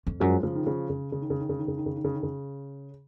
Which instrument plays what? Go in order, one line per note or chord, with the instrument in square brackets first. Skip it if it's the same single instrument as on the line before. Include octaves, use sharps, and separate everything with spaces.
[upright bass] F2
[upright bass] F#2 [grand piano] F3 G#3
[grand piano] C#3 F3
D#3
C#3 F3
C#3
C#3
D#3
C#3
D#3
C#3
D#3
C#3
D#3
C#3
D#3
C#3
D#3
C#3